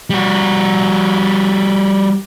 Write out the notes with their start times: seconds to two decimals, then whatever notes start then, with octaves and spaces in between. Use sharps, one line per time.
0.10 G3 F#4